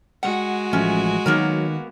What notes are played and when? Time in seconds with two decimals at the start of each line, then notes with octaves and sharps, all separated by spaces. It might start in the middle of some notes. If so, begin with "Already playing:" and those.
0.23 G#3 F#4 F#5
0.73 A1 F3 A3 C#4
1.26 D#3 F#3 A#3 B3 A#4